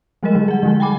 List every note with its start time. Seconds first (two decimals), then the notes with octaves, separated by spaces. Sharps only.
0.23 F3 G3 G#3 G#4 A#4 D#5
0.35 D3 F#3
0.48 G#4 F#5
0.63 D3 F3 G3 G#3
0.80 G5 G#5 B5 D6